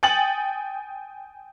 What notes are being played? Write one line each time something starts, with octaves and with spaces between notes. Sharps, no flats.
G5 G#5 D#6 A6 C#7 F#7